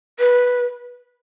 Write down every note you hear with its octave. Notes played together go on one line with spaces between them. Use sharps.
B4